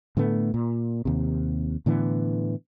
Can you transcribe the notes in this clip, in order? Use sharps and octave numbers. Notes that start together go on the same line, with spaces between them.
A2 D3 A3 B3
A#2
D#2 C3
A2 D3 E3 B3